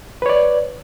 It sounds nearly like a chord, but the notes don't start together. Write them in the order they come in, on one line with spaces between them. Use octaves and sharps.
B4 C#5 D5